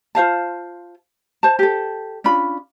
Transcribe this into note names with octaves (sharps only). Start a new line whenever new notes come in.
F4 C5 F5 A5
C5 A5
G4 A4
C#4 D4 F4 B5